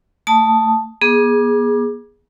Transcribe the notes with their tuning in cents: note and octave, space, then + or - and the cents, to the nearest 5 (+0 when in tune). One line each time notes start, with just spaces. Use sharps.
A3 +30 A5 +0 D#6 +0
B3 -40 G#4 +0 D6 +20